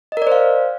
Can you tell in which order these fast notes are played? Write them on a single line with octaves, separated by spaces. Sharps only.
D#5 A#4 D5 C5 F5